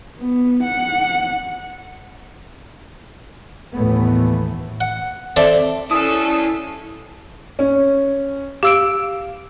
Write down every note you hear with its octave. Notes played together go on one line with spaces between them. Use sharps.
B3
F#5
D#2 A2 E3 A3 B3
F#5
C4 A4 D5 E5
C#4 E4 A4 D5 D#6 E6
C#4
G4 F5 E6 D7